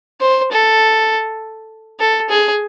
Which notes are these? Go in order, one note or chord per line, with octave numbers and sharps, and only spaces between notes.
C5
A4
A4
G#4